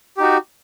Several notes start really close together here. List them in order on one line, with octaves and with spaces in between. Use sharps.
G4 D#4 F#4